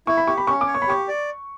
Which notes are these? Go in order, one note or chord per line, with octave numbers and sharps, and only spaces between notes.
E4 C#6
B5
G4 C#6
B5
C#4 C#6
D6
C#5
C#6
B5
G4 C#6
D5